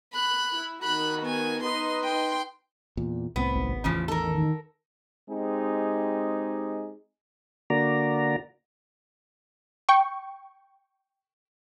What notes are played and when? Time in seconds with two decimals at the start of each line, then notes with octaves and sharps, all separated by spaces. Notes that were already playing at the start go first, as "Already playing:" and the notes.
0.13 B5 F#6
0.52 E4
0.83 D#3 F#4 B5 F#6
1.22 B3 G#5
1.63 D#4 B4 D#5 C6
2.03 G5 C6
2.97 E2 A#2
3.36 C2 A2 B3 C4
3.55 G#1
3.84 A1 E2 C#3 E3 F3
4.08 D#3 A4 A#4
5.30 G#3 C4 D#4 G4 G#4
7.70 D3 A#3 F#4 D5 A#5
9.89 G5 C#6